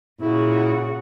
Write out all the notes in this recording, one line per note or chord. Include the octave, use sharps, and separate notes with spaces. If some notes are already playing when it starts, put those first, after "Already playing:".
A#2 C#3 E4 F#4